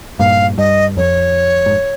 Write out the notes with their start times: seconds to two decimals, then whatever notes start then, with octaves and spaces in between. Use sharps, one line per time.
0.19 G2 A#2 F5
0.58 G2 D#5
0.97 F2 C#5
1.66 G#2